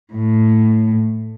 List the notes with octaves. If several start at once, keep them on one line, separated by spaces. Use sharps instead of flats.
A2